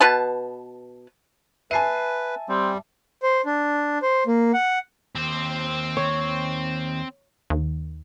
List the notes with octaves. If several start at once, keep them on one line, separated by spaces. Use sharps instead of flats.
B2 B4 A5
B4 E5 G#5 A5 C7 D#7
G3 C4
C5
D4
C5
A#3
F#5
D#2 C4 C5
C#5
D#2